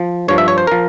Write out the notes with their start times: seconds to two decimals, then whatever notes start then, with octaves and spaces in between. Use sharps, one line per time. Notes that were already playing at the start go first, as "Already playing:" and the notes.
Already playing: F3
0.28 G2 F3 C#5
0.38 E5
0.48 C#5
0.58 C5
0.67 F3 A#4